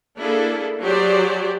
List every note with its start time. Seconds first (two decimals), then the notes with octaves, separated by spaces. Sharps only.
0.19 A#3 D4 E4 G#4 A4
0.82 F#3 G4 G#4 C5 D5